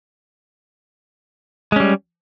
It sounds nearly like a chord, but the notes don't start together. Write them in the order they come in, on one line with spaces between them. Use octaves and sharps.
G#3 C#4 G3